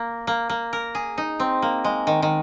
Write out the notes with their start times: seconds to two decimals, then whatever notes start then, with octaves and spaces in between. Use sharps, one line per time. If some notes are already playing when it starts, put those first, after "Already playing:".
Already playing: A#3
0.27 A#3
0.50 A#3
0.73 A#4
0.95 G#4
1.18 D#4
1.40 C4
1.62 A#3
1.84 G#3
2.07 D#3
2.22 D#3